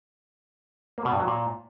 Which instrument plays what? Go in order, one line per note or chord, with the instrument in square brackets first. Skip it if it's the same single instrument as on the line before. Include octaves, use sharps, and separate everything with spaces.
[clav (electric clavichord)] A#3
B2
G2
F#3
A#2